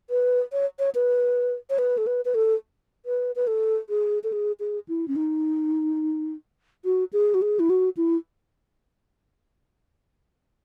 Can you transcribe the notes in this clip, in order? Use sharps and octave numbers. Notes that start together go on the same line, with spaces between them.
B4
C#5
C#5
B4
C#5
B4
A4
B4
B4
A4
B4
B4
A4
G#4
A4
G#4
G#4
E4
C#4
D#4
F#4
G#4
F#4
G#4
E4
F#4
E4